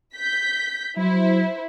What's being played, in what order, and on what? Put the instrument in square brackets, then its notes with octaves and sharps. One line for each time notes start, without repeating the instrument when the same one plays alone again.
[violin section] G6 B6
[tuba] F#3 [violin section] E4 C5